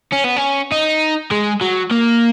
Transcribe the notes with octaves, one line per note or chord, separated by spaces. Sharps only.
C#4
B3
C#4
D#4
G#3
F#3
A#3